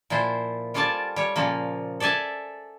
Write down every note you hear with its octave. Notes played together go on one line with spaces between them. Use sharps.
A#2 F3 E4 C5
G3 F4 A4 D5 G#5 A5
G3 C#5
A#2 C#3 F3 A#3
A4 D5 E5 G#5 A5